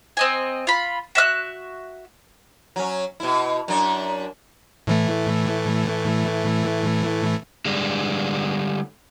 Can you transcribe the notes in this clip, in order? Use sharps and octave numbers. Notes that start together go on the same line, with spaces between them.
C4 D#5 G#5
F4 B5
F#4 E5 F6 F#6
F#3 C#4
B2 E4
F#2 D4
A2 E3 A3
D3 G3 G#3 D4